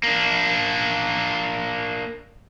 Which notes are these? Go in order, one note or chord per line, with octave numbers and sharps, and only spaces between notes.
A#3 D4